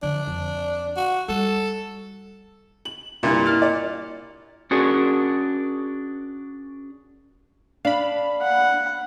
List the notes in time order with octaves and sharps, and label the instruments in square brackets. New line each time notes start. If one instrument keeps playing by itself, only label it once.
[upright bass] D3 F3 [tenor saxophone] D4
[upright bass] F2
[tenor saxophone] F#4
[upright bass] G3 [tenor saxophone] A4
[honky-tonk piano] F#7
[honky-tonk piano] C2 G2 G#6 [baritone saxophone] A#2
[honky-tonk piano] E4 F6 A6
D5
[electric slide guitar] C#4 D4 F#4 G#4 A#4
[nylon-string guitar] D4 [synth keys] F5 B5
[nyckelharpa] F#5